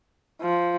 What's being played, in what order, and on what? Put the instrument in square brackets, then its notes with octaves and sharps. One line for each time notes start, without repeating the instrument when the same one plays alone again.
[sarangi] F3